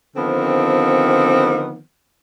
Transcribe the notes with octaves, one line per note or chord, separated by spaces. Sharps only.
D3 D#3 F3 B3 C4